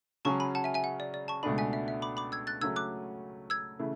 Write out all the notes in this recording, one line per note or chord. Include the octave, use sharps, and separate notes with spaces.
C#3 F#3 C#4 G#4 A5 C#6
G#5 B5
F#5 A5
E5 G#5
E5 G#5
F#5
D5
D5
A5 C#6
C#2 B2 A3 D4 G#5 B5
E5 G#5
E5
E5
B5 D6
B5 D6
E6 G#6
F#6 A6
C#3 F#3 A3 C#4 E6 G#6
D6 F#6
E6 G#6
C#3 E3 A3 E4